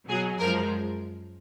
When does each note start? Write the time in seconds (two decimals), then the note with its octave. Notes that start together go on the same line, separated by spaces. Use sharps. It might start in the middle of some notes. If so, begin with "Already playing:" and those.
0.08 B2 F#3 G#4
0.39 F#2 F3 G#3 A#4